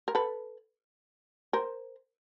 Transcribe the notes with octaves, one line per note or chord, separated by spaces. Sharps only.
A#4
A4 B4
A#4 C5